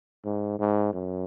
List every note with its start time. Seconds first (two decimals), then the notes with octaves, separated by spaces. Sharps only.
0.25 G#2
0.59 G#2
0.93 F#2